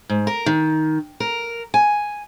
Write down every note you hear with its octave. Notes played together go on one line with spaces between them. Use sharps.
G#2
A#4
D#3
A#4
G#5